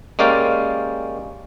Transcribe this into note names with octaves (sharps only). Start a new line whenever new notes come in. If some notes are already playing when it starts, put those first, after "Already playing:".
G#3 A#3 C#4 G4 D5 F5